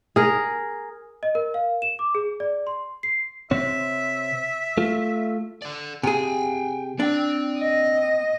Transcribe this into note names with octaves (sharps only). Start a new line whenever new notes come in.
G#4 A#4
D#5
A#4
F5
E7
D6
G#4
D5
C6
C7
C3 C4 C#5 E5
A3 F4
A4 D5
C3 G#4 G5 G#5
C4 D4 G5
D#5